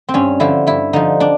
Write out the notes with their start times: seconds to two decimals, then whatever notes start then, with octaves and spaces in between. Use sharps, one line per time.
0.09 C4
0.14 G2 C#4
0.40 D3 F3 E4
0.67 G2 E4
0.93 D3 F3 D#4
1.20 D4